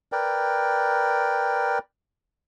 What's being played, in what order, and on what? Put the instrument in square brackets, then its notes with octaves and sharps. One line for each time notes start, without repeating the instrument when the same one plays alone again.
[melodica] A#4 B4 D5 G5